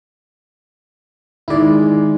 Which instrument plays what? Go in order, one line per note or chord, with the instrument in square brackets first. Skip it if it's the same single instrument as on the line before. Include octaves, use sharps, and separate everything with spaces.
[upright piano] D#3 G#3 [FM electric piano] E4 D5